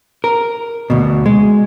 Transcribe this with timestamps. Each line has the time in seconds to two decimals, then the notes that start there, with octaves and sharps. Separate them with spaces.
0.24 A#4
0.90 D2 B2
1.26 G#3